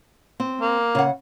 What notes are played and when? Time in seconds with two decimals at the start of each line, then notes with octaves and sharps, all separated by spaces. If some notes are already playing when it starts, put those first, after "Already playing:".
0.40 C4
0.61 A#3
0.95 C#3 F#5